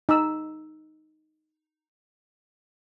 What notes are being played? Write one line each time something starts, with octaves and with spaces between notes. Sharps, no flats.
D#4 E6